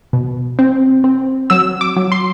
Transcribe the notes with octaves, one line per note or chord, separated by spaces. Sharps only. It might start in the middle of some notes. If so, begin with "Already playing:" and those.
B2
C4
C4
F#3 E6
D6
F#3
C6